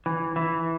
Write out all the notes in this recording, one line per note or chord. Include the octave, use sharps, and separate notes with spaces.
E3
E3